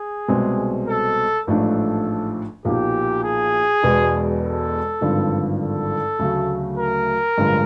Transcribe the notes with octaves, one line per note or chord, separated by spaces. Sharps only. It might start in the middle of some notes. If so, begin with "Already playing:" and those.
Already playing: G#4
C2 B2 G#3 C4
A4
A1 G#2 F3 A3 D4 A4
B1 A#2 F3 G4
G#4
E1 E2 B2 G#3 B3
A4
G#1 G2 D3 F3
A4
D2 C#3 F#3 A3
A#4
A1 G2 D3 F3 G#3